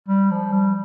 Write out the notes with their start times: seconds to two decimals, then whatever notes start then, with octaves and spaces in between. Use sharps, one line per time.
0.09 G3
0.31 F3
0.52 G3